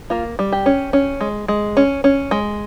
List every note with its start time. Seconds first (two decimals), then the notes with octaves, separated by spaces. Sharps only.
0.10 A#3 F4
0.39 G3
0.52 G4
0.66 C#4
0.93 C#4
1.21 G#3
1.48 G#3
1.77 C#4
2.04 C#4
2.31 G#3